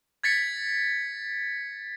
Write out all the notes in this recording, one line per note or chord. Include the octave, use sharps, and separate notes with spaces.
G#6 A6 B6 C#7